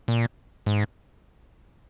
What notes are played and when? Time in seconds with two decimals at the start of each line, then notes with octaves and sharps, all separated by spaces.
0.08 A#2
0.66 G#2